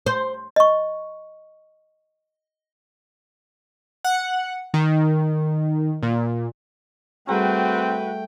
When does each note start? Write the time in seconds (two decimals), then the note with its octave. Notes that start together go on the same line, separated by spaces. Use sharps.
0.06 C5
0.56 D#5 C#6
4.04 F#5
4.74 D#3
6.03 A#2
7.28 G3 A3 C4 F#4 G#4 B4 G5 A#5